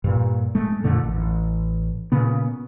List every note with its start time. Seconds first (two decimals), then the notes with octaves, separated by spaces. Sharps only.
0.04 G2 A#2
0.55 G#2 G#3 A3
0.84 F2 A#2 D3 A3
1.03 A1
2.12 A#2 C#3 B3